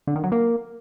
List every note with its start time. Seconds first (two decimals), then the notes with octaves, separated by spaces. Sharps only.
0.07 D3
0.16 D#3
0.24 F#3
0.32 A#3